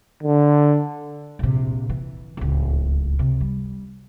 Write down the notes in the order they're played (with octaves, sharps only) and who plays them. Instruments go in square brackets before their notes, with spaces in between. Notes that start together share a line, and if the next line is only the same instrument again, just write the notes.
[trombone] D3
[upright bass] A#1 C3
E3
D1 C#2
C3
G3